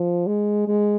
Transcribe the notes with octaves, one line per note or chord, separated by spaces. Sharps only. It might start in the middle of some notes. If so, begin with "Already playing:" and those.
Already playing: F3
G#3
G#3